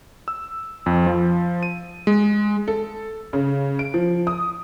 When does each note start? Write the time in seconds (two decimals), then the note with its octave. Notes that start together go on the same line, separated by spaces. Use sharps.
0.28 E6
0.86 F2
1.06 F3
1.63 D#7
2.07 G#3
2.68 A4
3.33 C#3
3.79 D7
3.94 F3
4.27 D#6